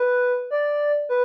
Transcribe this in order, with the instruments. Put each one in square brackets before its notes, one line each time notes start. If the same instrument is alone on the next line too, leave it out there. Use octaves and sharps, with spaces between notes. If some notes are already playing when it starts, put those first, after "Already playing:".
Already playing: [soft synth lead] B4
D5
B4